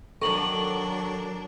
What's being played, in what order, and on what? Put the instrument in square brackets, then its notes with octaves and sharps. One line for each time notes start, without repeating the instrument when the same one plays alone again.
[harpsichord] D#3 [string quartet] F#3 D4 [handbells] A4 [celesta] C#6 F#7